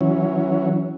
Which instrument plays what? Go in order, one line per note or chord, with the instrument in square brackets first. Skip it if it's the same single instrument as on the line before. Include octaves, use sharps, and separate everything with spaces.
[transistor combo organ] E3 F#3 C#4